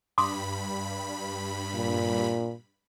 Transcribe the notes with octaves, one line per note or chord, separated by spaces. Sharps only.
G2 B5 C6 D6 D#6
A#2